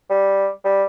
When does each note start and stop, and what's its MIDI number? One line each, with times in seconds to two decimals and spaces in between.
0.10 0.48 55
0.65 0.86 55